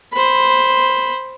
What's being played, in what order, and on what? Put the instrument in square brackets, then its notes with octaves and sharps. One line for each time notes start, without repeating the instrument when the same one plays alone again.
[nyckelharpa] C5 B5